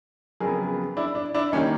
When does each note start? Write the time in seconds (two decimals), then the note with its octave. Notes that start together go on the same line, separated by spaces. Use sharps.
0.40 F2 C#3 F#3 B3 G#4 A#4
0.97 D4 E4
1.15 D4
1.34 D4 E4
1.52 D#3 G3 A#3 C#4 D#4